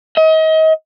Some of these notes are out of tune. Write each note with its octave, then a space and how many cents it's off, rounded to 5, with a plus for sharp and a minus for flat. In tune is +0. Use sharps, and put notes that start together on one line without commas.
D#5 +35